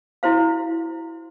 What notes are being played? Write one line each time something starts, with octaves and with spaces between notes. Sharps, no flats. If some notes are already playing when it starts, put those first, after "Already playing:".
E4 F#4 C5 F5